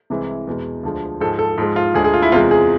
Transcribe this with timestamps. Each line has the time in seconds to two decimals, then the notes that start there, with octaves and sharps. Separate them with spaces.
0.10 C2 C3 E3 G#3
0.47 E2 B2 G#3
0.83 D2 D3 F3 G#3
1.20 G#2 F3 G#3 A4
1.39 A4
1.58 G#2 F3 G#3
1.76 F4
1.94 D2 D3 G#3 G#4
2.04 G#4
2.14 F4
2.22 E4
2.32 E2 C3 G#3 F4
2.51 G#4